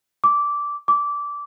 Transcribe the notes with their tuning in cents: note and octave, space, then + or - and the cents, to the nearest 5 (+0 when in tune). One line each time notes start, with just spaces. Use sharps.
D6 -10
D6 -15